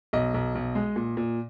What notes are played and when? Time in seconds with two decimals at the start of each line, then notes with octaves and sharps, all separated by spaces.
0.13 B1 D#5
0.34 B1
0.55 B1
0.75 G#3
0.96 A#2
1.17 A#2